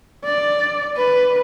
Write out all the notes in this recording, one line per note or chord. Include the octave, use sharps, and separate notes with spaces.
D5
B4